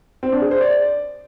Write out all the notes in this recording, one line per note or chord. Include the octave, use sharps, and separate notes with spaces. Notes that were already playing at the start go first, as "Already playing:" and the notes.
C4
D4
G#4
C5
D5